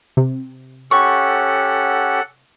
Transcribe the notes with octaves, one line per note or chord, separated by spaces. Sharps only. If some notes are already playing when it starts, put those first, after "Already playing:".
C3
C#4 G4 A4 F#5 C#6